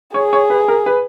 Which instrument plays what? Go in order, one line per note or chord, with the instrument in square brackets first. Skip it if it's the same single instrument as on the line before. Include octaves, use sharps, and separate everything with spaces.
[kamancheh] G#4 [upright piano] C#5
[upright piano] C#5
B4
A#4
B4